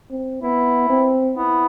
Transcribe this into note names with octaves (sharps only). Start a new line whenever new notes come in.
C4
B3 E4
C4
B3 E4